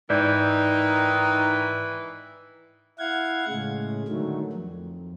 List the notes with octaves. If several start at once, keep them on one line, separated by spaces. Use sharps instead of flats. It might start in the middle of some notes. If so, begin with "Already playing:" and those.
G#2 D#3 E3 D#4 D5 G6
E4 F5 F#5 G#6
A2 C#3 G#3
D3 D#3 F#3 A3
F2